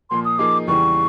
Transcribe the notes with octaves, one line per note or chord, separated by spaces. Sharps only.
A#2 F3 A#3 C6
D#6
F3 A#3 D#4 G#4 D6
E2 C#3 E3 G3 C#6